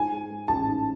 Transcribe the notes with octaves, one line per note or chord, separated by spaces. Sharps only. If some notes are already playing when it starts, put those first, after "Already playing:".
Already playing: G#2 G#5
G#3
G#3
A1 A5
G#2